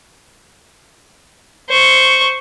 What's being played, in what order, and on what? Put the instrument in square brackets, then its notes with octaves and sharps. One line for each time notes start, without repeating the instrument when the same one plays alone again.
[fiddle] C5 C#6